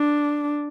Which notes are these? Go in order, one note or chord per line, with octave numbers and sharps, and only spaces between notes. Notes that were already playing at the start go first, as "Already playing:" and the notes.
Already playing: D4